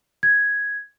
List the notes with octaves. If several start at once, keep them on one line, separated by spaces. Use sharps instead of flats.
G#6